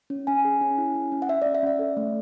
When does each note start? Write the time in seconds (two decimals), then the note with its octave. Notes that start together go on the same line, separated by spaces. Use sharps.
0.10 C#4
0.27 C#4 G#5
0.45 G#4
0.61 C#4
0.78 E4
0.95 C#4
1.12 C#4
1.22 F#5
1.29 C#4 E5
1.42 C#4 D5
1.55 E5
1.63 C#4 D5
1.79 A4
1.97 A3